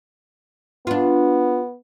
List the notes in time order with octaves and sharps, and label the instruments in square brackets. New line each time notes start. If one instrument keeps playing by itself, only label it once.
[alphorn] B3 [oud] D4 F4